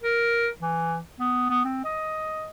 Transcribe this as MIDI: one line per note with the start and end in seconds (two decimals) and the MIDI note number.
0.03 0.48 70
0.60 0.97 52
1.20 1.46 59
1.50 1.62 59
1.64 1.83 60
1.85 2.50 75